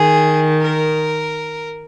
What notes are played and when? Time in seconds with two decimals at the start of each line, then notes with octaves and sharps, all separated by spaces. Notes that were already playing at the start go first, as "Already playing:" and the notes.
Already playing: D#3 G#4
0.61 A#4